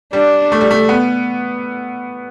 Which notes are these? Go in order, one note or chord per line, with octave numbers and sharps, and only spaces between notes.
G3 D4
A3
G3
A3
B3